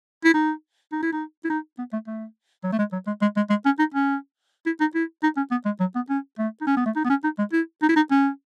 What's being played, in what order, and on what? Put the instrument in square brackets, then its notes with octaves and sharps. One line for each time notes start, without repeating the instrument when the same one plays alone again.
[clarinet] E4
D#4
D#4
E4
D#4
E4
D#4
B3
A3
A3
F#3
A3
G#3
F#3
G#3
G#3
G#3
G#3
C#4
D#4
C#4
E4
D#4
E4
D#4
C#4
B3
G#3
F#3
B3
C#4
A3
D#4
C#4
B3
A3
D#4
B3
C#4
D#4
G#3
E4
D#4
E4
D#4
C#4